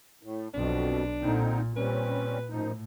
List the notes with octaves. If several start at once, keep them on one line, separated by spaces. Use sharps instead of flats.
A2
B1 F2 B2 D4
A#2 D3 C4 D#4
A#2 G3 C4 C#4 B4
F#2 A2 F3 D#4